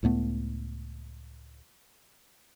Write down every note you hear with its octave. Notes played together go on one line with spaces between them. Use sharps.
C#2 A2 A3 B3